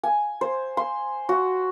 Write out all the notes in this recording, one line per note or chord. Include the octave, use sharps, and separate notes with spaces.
G#5
C5
C6
F#4